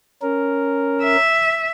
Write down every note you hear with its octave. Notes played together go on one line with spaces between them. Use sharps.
C#4 A#4
E5